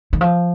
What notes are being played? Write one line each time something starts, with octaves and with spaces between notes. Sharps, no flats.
D#3
F3